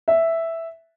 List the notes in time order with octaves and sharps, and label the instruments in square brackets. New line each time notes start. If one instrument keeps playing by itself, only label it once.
[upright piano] E5